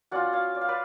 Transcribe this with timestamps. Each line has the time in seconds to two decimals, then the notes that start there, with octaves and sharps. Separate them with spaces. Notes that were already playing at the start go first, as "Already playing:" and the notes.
0.11 F#3 C#4 F4 D5 F#5
0.33 C#5 F5
0.55 D5
0.61 F5
0.68 B4 D5